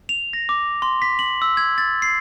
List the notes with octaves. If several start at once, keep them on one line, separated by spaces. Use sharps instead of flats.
F7
A#6
D6
C6
B6
F#7
E6
G#6
A6
C7